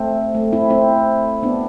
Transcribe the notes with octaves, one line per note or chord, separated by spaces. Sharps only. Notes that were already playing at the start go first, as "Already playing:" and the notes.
Already playing: A3 C4
A3
C4 E4
C4 E4
B3 D4